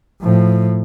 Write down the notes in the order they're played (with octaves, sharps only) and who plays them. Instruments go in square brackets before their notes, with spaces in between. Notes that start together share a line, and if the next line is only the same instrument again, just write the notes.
[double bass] A2 F3